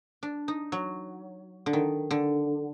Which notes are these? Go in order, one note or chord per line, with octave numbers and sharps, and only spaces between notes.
D4
D#4
F#3
D3
D#3
D3